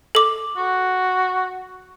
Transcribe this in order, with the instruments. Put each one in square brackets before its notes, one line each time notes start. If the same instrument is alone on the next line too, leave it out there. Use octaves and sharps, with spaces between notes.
[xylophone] A4 D6
[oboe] F#4